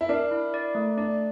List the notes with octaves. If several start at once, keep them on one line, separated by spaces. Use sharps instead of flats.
E4
D4 A#4
E4
D5
A3
D4 D5